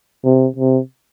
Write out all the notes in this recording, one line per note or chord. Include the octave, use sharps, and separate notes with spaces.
C3
C3